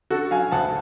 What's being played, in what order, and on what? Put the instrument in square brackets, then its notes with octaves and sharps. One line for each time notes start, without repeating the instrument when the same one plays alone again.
[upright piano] D3 F#4 A4
F#3 F5 G#5
D2 F#5 A5